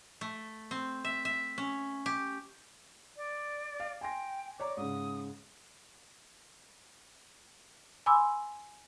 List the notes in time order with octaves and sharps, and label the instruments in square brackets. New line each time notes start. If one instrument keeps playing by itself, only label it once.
[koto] A3
C4
E5
E5
C#4
G4
[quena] D5
[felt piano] F5
[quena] G5 [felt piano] G#5 C6 A#6
[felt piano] C#5 D5 A#5 [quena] D6
[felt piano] G#2 C#3 [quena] D#6
[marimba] G#5 B5 C6 D6 E6